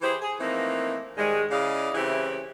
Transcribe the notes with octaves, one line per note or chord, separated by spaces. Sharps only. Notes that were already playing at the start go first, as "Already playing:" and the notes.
E3 E4 G4 G#4 C5
G#4
E3 F3 A3 A#3 C4 D#4
G#2 D#3 G3 G#3
C#3 E4 D5 D#5 F5
C#3 E3 A3 C4 E4 G4